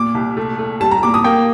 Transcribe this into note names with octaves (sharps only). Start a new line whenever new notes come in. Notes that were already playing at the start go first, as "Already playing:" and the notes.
Already playing: A#2 D6
C2
A3
A3
G3 A5
A#5
A#2 D6
D#6
A#3 G5